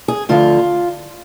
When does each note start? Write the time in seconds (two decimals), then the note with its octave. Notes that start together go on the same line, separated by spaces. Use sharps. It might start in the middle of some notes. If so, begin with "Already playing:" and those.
0.08 G#4
0.29 D2 D3 F3 F4